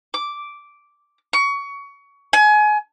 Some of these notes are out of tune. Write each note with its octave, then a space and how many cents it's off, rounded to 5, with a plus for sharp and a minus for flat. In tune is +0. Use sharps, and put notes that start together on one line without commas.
D6 -5
C#6 +25
G#5 +25